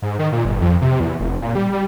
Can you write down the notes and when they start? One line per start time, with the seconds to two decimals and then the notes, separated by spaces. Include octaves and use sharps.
0.02 G#2
0.19 D#3
0.32 A#2
0.45 G1
0.61 F2
0.81 C3
1.00 E2
1.20 F1
1.42 A#2
1.55 G3
1.72 G3